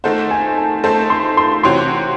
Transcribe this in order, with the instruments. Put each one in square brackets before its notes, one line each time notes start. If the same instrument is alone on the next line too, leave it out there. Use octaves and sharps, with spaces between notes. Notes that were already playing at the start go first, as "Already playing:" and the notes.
[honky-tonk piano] D#3 A3 D#4 A4 C5 [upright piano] F#5
[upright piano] G#5
A5
[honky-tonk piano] D#3 A3 D#4 A4 C5 [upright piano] A5
[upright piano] C6
C6
[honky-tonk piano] C3 E3 C4 F#4 C#5 [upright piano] C6